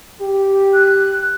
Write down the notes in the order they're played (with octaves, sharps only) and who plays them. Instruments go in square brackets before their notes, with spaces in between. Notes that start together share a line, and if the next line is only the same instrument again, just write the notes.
[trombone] G4
[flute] F#6